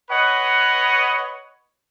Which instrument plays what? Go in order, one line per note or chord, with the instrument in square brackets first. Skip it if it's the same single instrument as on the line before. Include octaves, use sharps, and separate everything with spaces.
[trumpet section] B4 C#5 D#5 F#5